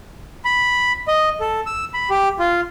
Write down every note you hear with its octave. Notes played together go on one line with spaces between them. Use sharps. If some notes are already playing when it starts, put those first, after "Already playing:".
B5
D#5
A4
E6
B5
G4
F4